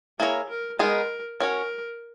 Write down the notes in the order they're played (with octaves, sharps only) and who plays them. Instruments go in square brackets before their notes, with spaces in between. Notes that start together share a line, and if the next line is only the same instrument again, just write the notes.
[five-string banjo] A#3 E4 A#4 C#5 [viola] G#4
[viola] A#4
[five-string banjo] G#3 B3 D#4 G#4 [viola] A#4
[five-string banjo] C#4 F#4 C#5 [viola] A#4